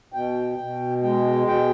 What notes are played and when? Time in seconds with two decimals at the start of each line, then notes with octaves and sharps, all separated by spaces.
0.13 B2 G5
0.58 B2
1.03 G#3 G5
1.47 B2 G5